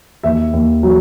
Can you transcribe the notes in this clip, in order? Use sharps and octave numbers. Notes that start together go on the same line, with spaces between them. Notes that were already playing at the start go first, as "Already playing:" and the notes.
D#2 E5
D#2
F#3